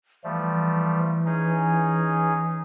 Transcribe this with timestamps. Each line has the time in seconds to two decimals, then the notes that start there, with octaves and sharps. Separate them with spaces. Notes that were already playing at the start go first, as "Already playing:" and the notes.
0.24 E3 F3 G3 A3
1.26 C#4 D#4 G#4